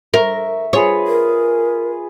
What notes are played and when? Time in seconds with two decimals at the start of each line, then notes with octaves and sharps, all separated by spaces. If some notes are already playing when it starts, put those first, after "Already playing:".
0.14 A#4 E5 C#6
0.73 F4 G#4 B4 C#5
1.07 A#4